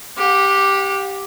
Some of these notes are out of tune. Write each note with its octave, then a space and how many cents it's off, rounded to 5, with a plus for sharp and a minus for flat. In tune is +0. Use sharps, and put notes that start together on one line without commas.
G4 +0 F#5 -40